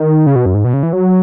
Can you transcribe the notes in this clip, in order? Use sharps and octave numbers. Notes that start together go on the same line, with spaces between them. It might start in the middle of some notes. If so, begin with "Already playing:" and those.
Already playing: D#3
C#3
B2
F#2
G#2
B2
C#3
E3
F#3